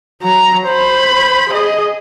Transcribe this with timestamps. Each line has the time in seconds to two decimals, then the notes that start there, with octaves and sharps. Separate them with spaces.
0.22 F#3 A#5
0.67 C5 B5
1.50 G#4 D#5